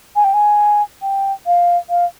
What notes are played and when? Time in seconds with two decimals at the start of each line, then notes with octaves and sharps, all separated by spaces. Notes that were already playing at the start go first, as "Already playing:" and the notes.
0.16 G#5
0.24 G5
0.34 G#5
1.02 G5
1.47 F5
1.90 F5